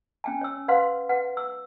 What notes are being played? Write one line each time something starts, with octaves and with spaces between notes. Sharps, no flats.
C#4 G5 G#5
C#5 E6
B4 C5 F5 F#5 C6
B4 F#5
E6